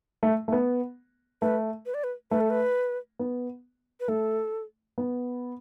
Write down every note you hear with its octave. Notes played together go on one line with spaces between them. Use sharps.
A3
A3
B3
A3 B4
B4
D5
B4
A3 B4
A4
B4
B3
B4
A3 A4
B3